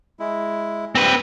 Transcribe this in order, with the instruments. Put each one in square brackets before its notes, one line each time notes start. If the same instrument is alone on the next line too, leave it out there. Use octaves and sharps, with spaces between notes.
[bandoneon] G#3 E4
[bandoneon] G3 [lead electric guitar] C4 B4